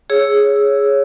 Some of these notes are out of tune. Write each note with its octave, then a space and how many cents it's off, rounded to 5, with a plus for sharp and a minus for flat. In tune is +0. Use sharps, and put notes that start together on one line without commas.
G#4 +0 C#5 +0 E6 +0